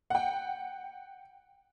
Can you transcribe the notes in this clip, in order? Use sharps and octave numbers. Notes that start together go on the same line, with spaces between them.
F#5 G5